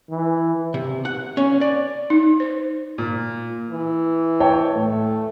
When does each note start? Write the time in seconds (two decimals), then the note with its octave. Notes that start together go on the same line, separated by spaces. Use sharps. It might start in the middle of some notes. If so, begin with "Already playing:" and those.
0.10 E3
0.74 C3
1.05 F#5
1.37 C#4
1.61 D5
2.10 D#4
2.40 C5
2.98 A#2
3.71 E3
4.40 C#5 G5 A5
4.75 A2 A3